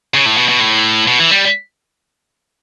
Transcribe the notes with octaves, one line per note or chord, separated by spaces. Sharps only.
C#3
A2
B2
B2
A2
B2
E3
G3